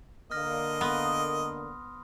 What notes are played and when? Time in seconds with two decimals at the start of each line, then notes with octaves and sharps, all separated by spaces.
0.31 D3 A#3 D#5 F6 A#6
0.81 B3 B5 C6 D#6